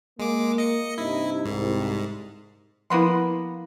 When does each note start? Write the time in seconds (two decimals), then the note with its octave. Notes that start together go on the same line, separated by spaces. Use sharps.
0.19 G#3 A#3 D6
0.58 D#5 C#7
0.98 G2 C3 D#4 E4
1.45 C2 G#2
2.90 F3 A#3 B3 E4 C6